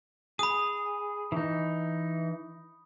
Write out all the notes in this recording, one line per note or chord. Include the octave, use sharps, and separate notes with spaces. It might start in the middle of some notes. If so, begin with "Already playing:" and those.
G#4 B5 D#6
E3 D#4